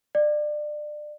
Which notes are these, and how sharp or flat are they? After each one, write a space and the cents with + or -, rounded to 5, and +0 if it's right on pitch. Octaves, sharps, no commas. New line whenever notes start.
D5 +25